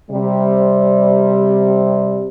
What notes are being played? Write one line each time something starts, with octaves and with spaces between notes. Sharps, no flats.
C3 G3